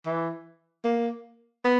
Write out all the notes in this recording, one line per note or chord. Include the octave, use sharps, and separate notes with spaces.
E3
A#3
B3